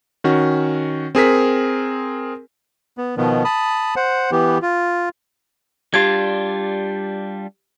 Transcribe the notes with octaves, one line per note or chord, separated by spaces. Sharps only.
D#3 C#4 F#4
C4 G#4 A#4 B6
B3
B2 D#3 F3 B3
A5 B5 D#6
C5 F#5
E3 B3 G4
F4
G3 D4 F4 G4 G#6